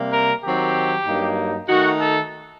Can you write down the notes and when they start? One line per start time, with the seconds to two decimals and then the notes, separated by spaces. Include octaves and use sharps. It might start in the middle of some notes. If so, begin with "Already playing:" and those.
Already playing: C3 G3 A#3
0.12 A#4
0.44 D#3 F#3 C4 G4
1.06 G2 F#3 A#3 D#4
1.69 D#3 A3 D#4 F#4
2.00 A4